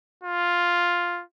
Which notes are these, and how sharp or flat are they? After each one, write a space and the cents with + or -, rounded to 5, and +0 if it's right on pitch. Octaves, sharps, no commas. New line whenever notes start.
F4 +5